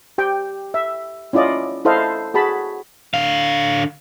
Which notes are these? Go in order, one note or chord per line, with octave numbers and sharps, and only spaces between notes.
G4 G5
E5
C#4 E4 F4 D5 D#5
E4 A4 C5 D#5 F5
F#4 G#4 A5 B5
D3 F5